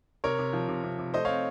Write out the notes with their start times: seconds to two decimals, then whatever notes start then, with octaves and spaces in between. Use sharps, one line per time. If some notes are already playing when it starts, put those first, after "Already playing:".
0.24 C3 A#4 C#5
0.39 C3
0.53 F3
0.68 C3
0.84 C3
0.99 C3
1.14 A3 C5 D#5
1.25 C#5 F5
1.29 C4